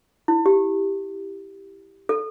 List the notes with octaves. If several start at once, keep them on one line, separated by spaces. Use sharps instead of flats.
E4
G4
A4